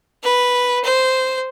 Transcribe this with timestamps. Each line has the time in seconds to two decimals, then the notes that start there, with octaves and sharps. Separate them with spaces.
0.23 B4
0.84 C5